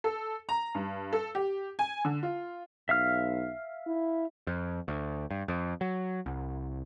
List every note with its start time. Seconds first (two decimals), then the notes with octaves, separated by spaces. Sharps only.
0.04 A4
0.49 A#5
0.75 G2
1.13 A4
1.35 G4
1.79 G#5
2.05 D3
2.23 F4
2.89 B1 E5 F5 F6
3.87 E4
4.47 F2
4.88 D2
5.31 G2
5.48 F2
5.81 F#3
6.26 C2